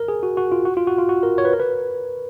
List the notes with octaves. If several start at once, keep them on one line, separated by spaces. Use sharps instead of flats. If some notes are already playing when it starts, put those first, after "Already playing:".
Already playing: A#4
G#4
F#4
F#4
F4
F#4
F4
F#4
F4
F#4
A#4
C#5
B4
A#4
B4